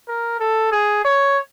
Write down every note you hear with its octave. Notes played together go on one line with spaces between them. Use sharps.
A#4
A4
G#4
C#5